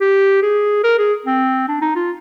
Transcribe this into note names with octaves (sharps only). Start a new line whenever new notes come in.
G4
G#4
A#4
G#4
C4
D4
D#4
F4